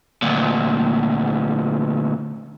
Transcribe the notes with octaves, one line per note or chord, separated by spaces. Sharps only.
D2 A#2